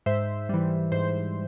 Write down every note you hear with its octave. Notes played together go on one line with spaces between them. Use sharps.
G#2 C5 E5
E3 G3
G#2 C5